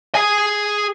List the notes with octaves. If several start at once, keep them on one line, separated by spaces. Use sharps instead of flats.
G#4 G#5